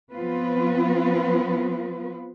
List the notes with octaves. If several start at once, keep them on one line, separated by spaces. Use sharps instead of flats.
F3 B3 C4 F4 B4